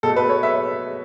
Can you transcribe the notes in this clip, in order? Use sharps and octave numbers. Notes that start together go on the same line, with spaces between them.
B2 A3 A4
B4
C#5
E5